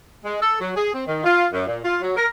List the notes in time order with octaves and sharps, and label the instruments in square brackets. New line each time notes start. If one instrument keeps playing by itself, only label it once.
[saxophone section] G#3
A4
F#3
G#4
C4
D#3
F4
F#2
A#2
F4
F#3
A#4